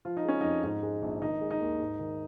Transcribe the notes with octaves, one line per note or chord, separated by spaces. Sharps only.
F3 F4
D#4
G#3 C#4
F2 D#4
G#2 D#4
G#3
A#1
D#3 D#4
G#3
D#4
D#2
G#2
D#3